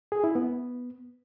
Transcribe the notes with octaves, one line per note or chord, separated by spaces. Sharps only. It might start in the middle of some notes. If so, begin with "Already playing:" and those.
G#4
E4
B3